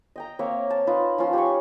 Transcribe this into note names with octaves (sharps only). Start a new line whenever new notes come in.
D#5 G5 A#5
A#3 C4 C#5 E5
A5
D#4 F4 B4
F3 C#4 F4 A5
G4 G#5 C#6